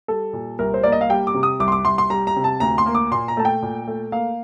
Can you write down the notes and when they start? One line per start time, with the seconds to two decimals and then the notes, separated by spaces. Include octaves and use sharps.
0.08 G3 A4
0.33 A#2
0.59 C2 A#4
0.74 C5
0.83 A#3 D5
0.92 D#5
1.01 F5
1.10 G3 G5
1.27 D6
1.34 C3
1.43 D#6
1.60 C2 D6
1.68 C6
1.72 D6
1.85 C2 C6
1.98 C6
2.10 G3 A#5
2.27 A#5
2.36 C3
2.44 A5
2.60 D2 A#5
2.78 C6
2.86 A#3
2.95 D6
3.12 A#2 C6
3.28 A#5
3.37 A3 A5
3.45 G5
3.62 A#2
3.88 A3
4.12 A#3 F5